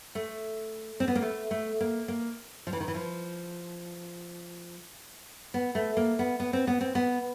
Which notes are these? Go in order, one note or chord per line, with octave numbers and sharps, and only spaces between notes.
A3
C4
B3
A#3
A3
A3
A#3
A#3
F3
E3
D#3
E3
F3
B3
A3
A#3
B3
B3
C4
B3
C4
B3